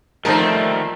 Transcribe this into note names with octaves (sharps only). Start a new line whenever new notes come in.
D#3 F3 G3 A3 C4 D#4 A#4 A5